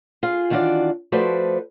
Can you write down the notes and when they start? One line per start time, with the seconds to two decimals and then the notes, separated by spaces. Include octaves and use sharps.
0.23 F4 G#4
0.50 D#3 E3 D4 F4 F#4 D5
1.12 F3 A3 F#4 B4 C5 D5